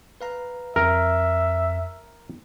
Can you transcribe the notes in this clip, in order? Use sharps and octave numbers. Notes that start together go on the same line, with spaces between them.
B4 F5 A#5
F2 A#4 E5